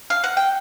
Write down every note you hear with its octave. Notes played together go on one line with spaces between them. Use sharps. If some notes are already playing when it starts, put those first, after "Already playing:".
F5
F#5
G5